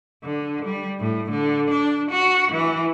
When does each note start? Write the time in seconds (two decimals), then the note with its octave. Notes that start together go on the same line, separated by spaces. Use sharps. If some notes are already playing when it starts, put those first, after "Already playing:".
0.24 D3
0.65 G3
1.00 A2
1.31 D3
1.70 D4
2.11 F#4
2.52 E3